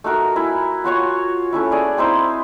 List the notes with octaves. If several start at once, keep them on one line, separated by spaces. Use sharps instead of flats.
A3 D#4 F#4 A#4
E4 G#5
F4 F#4 C#5 C#6
A3 C#4 E4
G#4 D5
C4 D#4 E4 C5